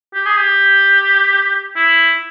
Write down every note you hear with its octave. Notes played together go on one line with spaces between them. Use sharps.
G4
G#4
G4
E4